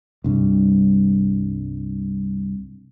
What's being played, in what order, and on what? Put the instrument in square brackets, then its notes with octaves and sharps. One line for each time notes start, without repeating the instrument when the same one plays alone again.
[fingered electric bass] C2 G2